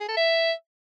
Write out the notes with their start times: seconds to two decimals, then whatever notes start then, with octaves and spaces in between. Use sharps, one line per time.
0.01 G#4
0.09 A4
0.17 E5